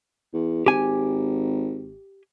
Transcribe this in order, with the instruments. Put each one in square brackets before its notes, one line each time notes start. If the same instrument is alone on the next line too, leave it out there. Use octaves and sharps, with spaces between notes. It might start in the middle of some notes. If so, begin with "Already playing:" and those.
[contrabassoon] E2
[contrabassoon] G#1 [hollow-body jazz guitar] G4 G#5